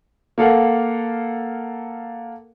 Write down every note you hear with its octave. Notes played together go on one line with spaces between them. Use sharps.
A#3 A4 F5 F#5